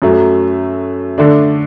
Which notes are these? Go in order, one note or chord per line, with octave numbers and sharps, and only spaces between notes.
F#2 F#3 A3
D3 A3 D4